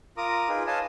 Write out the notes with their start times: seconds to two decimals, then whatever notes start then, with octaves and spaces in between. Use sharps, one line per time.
0.17 F4 A#4 A#5 D6 D#6
0.49 D#4 F4 G#4 B4
0.67 B4 C#5 D#5 F5 G#5 A5